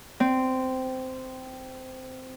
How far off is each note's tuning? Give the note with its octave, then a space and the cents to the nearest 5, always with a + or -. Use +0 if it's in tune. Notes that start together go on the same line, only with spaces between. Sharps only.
C4 -15